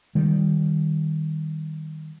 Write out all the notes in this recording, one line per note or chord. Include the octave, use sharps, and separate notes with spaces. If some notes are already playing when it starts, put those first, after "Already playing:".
D#3 G3